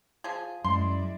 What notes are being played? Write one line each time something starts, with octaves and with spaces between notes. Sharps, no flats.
F3 G#4
F#2 G#3 E4 D5 C6